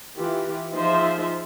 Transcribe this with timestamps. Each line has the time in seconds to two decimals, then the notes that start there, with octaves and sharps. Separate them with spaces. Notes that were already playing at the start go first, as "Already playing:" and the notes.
0.15 E3 F4 G4
0.73 F3 D#4 F4 G#4 C5 E5